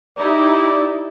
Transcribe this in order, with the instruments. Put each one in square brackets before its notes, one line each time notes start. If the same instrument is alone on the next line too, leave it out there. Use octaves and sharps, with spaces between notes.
[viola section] D#4 E4 G4 [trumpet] D5